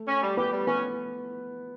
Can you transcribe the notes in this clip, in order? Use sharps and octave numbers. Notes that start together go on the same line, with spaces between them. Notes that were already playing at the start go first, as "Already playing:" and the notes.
Already playing: A3 A4
C#4
G3
B3 G4 B4
G3
B3 C#4 B4